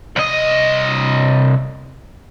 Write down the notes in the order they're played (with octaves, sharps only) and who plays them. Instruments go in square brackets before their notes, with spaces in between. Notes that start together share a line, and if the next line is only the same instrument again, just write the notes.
[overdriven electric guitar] C2 D#5